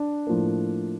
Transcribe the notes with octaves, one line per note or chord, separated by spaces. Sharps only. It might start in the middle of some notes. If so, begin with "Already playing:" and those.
Already playing: D4
A2 F3 A#3